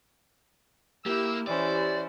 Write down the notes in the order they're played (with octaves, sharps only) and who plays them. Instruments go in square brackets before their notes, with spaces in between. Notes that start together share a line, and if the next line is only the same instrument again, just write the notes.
[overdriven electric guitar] A#3 [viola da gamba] E4 [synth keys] G4 [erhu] E6
[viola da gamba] E3 C#4 E4 [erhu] C5 [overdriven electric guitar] D5